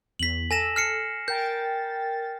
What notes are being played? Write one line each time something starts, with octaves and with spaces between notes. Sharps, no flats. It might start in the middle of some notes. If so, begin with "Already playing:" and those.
E2 B6 F#7
A4 G#5 A#6 E7
F6 C7 C#7
A#4 G5 G6 A6